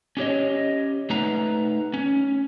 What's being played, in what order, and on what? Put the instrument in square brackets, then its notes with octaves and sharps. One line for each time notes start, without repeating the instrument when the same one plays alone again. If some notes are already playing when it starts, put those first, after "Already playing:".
[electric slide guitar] C#4 G4 C#5 D#5
A3 D#4 B4 F#5 A#5
C#4